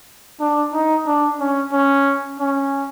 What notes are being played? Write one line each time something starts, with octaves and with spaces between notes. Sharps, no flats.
D4
D#4
D4
C#4
C#4
C#4